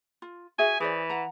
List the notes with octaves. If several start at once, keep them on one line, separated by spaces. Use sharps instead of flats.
F4
F#4 G#4 E5 G#5
E3 G#4 C5 D5
F#5 A#5